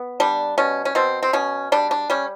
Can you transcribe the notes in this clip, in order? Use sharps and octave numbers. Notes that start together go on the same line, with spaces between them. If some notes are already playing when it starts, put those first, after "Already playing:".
Already playing: B3
G3 D4
B2 C#4
C#4
B2 C4
C4
B2 C#4
G3 D4
D4
G3 C#4